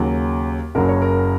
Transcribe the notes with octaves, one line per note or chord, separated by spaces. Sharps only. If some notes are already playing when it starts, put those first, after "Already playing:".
Already playing: D#2 C#3 F#3
F#1 F#2 F#3 A#4
C#5
A#4